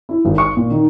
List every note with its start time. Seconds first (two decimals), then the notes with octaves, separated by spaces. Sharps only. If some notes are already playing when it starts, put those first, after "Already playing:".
0.09 E4
0.25 G#1
0.38 C#6
0.57 A#2
0.71 D#3